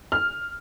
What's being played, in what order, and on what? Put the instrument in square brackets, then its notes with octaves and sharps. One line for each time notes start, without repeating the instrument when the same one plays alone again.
[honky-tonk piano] F6